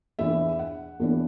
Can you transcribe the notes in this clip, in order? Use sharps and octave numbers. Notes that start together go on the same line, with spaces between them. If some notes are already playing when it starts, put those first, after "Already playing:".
E2 E3 B3 D4 E5
F#5
E2 E3 B3 D4